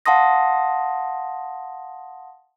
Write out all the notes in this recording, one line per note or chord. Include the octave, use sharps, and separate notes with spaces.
F5 F#5 A5 C6 D#6 A#6